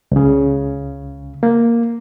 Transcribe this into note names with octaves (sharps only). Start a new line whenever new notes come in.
C#2 C#3
A#3